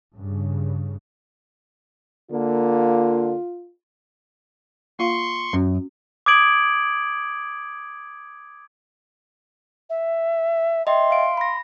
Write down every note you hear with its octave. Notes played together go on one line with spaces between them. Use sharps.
G2 C#3
D3 A#3 F4
A#3 F4 F5 C6 C#6
F#2 C#4 F#4
D6 D#6 G#6 D7 F#7
E5
D#5 E5 G5 C6
F5 D7
B5 A#6